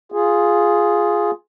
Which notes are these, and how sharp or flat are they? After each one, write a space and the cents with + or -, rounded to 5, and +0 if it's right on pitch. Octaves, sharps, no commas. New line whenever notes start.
F4 +0 G#4 +0